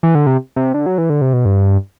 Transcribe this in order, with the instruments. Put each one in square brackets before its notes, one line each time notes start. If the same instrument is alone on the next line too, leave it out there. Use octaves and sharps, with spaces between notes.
[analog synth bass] E3
D3
C3
C3
D3
F#3
E3
D3
C3
B2
G2